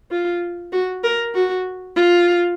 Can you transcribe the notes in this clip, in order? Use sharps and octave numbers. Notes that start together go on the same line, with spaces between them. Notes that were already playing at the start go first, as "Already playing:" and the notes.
F4
F#4
A#4
F#4
F4